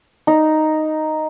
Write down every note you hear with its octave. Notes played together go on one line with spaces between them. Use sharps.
D#4